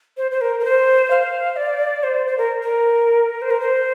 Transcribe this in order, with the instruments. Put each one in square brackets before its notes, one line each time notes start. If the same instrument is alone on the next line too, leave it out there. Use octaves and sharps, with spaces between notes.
[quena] C5
C5
A#4
A#4
C5
F5
D5
C5
C5
A#4
A#4
C5
A#4
C5